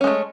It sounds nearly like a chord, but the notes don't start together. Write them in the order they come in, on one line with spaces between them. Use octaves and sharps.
C#4 G#3 A3